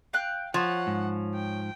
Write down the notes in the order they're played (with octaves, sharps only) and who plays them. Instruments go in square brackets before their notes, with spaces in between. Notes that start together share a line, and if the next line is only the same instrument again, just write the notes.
[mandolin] F5 G5 F#6
[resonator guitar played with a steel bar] F3 [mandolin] C#5 [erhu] F#5
[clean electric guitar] G#2
[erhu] G5